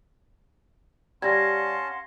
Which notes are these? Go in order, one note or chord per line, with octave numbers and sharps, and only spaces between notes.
G3 C#4 F5 F#5 A5 C6 G#6 A#6